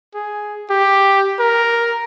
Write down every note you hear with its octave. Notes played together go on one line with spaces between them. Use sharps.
G#4
G4
A#4